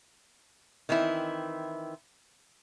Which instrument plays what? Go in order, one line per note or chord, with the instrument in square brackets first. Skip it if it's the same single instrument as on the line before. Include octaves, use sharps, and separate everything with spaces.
[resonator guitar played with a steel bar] D#3 E3 C4 E4